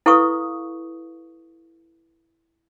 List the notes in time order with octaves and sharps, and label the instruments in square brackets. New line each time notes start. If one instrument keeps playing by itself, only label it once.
[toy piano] E4 A4 B4 F5 C#6 D#6